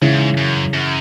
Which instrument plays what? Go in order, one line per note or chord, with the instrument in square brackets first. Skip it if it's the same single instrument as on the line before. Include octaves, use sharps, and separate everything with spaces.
[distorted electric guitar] G#2 [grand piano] C#3 E3
[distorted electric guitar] F#2
F#2